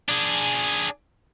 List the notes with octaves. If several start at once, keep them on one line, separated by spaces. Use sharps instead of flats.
D4 G#4